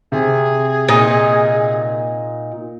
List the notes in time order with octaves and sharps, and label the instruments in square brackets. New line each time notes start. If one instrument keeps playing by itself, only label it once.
[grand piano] C3 [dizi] G#4
[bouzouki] A#2 D#4 D#5